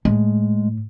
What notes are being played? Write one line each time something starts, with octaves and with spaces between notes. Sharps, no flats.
A2 G#3